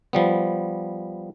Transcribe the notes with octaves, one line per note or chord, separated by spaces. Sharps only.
F3 G3 B3